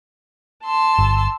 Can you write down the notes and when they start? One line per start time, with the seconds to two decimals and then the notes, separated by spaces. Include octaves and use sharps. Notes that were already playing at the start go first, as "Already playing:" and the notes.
0.64 A5 C6 E6
0.99 G1